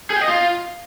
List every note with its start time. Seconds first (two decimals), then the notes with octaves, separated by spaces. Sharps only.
0.10 G#4
0.16 G5
0.22 D#5
0.28 F4